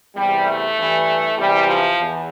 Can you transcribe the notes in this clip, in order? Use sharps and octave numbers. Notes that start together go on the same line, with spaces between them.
E2 C3 E3 G3
A3
G2 E3
E2 C3 E3 G3
F3
E2